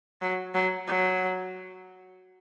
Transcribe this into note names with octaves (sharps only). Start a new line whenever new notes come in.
F#3
F#3
F#3